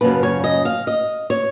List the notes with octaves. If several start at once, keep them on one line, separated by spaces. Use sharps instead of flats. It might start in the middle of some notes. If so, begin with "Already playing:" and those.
F#2 C#3 F3 A#3 B4
C#5
D#5
F5
D#5
C#5